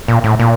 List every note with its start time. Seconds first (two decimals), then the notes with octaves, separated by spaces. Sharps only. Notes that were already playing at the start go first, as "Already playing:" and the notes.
0.08 A#2
0.24 A2
0.40 A#2